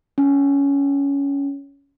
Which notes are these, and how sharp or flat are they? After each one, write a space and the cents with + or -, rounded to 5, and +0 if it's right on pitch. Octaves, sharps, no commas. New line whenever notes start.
C#4 +15